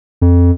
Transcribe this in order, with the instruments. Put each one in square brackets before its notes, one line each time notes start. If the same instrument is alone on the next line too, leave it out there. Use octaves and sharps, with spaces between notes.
[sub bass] F2